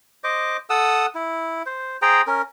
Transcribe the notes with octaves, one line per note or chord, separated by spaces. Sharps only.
C5 D#5 D6
A4 F#5 D#6 E6
E4
C5
G#4 C5 G5 A#5
C#4 A#4